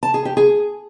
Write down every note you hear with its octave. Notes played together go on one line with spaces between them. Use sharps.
A5
G#4
G4
G#4